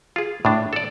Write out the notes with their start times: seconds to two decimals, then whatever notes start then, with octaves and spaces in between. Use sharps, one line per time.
0.16 F4 G#4
0.45 A2 D4
0.73 A4 D5